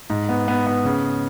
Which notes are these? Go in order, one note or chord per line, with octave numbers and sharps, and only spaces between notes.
G#2
B3
B3
B3
C#3